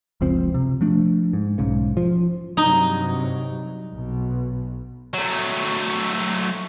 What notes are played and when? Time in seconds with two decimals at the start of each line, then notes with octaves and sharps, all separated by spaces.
0.21 F#1 C#2 F3 C4
0.54 C3
0.81 F3 A3 D4
1.33 G#2
1.58 B1 G#2 C#3
1.97 F3
2.57 G2 C3 F#3 D#4
3.94 B1 B2
5.14 F#3 A3